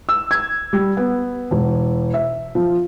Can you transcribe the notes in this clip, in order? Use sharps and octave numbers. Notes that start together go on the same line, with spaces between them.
E6
G#6
G3
B3
E1
E5
F3